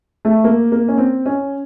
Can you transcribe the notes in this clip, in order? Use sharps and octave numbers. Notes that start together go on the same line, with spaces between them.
A3
A#3
A#3
C#4
C4
C#4